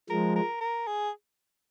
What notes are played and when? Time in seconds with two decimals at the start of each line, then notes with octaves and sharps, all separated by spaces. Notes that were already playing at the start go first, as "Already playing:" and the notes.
0.10 F3 G#3 A#4
0.36 A#4
0.61 A#4
0.87 G#4